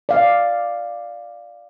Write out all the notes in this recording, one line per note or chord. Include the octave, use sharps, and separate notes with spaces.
D5 F5